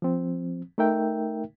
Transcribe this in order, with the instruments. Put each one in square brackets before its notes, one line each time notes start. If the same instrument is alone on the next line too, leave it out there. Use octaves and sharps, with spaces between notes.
[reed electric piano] F3 C4
A3 D#4 A#4 E5 G5